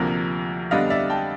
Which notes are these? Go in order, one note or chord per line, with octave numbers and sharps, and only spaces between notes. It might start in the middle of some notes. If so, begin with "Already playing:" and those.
Already playing: D2 C3 F3 A#3
F2 D3 G3 B3 D4 D#5 F5
D5 E5
G5 A5